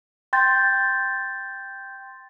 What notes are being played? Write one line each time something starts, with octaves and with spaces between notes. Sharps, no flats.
G5 C6 G6 A6